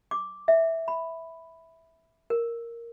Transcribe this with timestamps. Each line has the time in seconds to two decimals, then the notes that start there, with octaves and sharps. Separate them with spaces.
0.11 D6
0.48 E5
0.88 B5
2.30 A#4